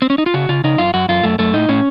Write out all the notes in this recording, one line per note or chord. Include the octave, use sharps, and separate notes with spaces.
C4
C#4
D#4
F4
C#3 F#4
C#3 F4
C#3 D#4
F#2 F4
F#2 F#4
F#2 F4
F#2 A3
F#2 A3
A2 D#4
A2 C#4